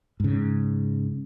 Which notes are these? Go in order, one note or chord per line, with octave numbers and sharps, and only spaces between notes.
G#2 C#3